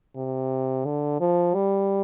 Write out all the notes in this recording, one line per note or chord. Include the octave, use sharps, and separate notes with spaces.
C3
D3
F3
G3